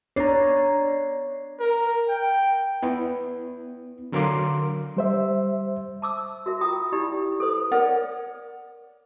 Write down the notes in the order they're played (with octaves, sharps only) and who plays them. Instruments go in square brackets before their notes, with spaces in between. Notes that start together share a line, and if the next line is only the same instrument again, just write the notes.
[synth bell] B3 D4 C7 [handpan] C#5 [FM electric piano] D5 A#5
[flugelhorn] A#4
G5
[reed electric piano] B3 E4
D3 F#3 A#4 F5 C6 D6
G3 C5 E5
[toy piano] A5 D6 E6
F#4 A#4 E5
F4 G5 A#5 D#6
D#4 E4 G4 D5 B5
A4 B4 C5 D#6
[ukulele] A#4 C#5 D5 F#5